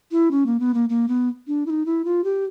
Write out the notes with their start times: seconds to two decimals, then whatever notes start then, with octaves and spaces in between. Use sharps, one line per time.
0.12 E4
0.31 C#4
0.46 A#3
0.60 B3
0.74 A#3
0.89 A#3
1.08 B3
1.47 D4
1.66 E4
1.70 D#4
1.86 E4
2.05 F4
2.24 G4